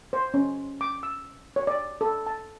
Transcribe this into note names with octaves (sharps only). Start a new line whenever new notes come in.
C5
C#4
D6
E6
C#5
D5
A4
A5